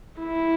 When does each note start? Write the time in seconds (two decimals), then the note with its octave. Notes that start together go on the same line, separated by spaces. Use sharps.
0.20 E4